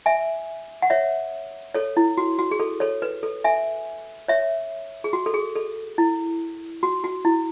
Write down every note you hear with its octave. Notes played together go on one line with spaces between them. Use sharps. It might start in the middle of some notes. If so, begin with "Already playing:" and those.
E5 G#5
F#5
C#5 E5
A4 C#5
E4
F#4
F#4
G#4
A4
A4 C#5
B4
A4
E5 G#5
C#5 E5
G#4
F#4
A4
G#4
A4
E4
F#4
F#4
E4